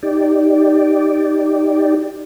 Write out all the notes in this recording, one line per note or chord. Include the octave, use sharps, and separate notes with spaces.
D#4 G4 D5